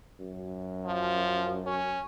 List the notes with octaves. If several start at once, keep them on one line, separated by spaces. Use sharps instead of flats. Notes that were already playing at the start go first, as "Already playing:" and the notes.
F#2
F3
C#4